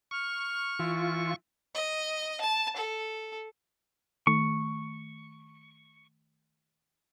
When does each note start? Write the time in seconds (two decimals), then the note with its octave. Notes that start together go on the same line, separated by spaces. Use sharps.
0.11 C#6 F6
0.79 E3 F4
1.75 D#5
2.41 A5
2.76 A4
4.27 D#3 A3 C#6